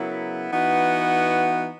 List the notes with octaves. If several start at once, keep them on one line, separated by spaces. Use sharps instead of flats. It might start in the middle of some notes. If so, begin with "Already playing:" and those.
Already playing: C#3 F#3 B3 E4 A#4
E3 B3 D#4 F#4